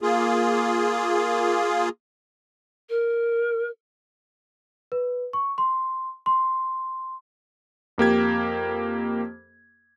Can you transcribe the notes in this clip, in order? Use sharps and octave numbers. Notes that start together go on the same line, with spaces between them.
A#3 F4 G#4
A#4
B4
C#6
C6
C6
F2 A#3 G4 G#6